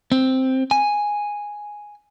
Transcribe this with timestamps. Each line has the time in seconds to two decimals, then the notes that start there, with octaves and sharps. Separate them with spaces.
0.12 C4
0.71 G#5